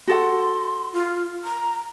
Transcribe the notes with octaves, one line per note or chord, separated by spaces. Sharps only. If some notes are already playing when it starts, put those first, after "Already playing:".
F#4 A4 F#5 C6
F4
A#5